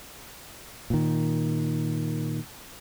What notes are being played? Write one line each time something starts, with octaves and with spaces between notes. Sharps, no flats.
A#2 D#3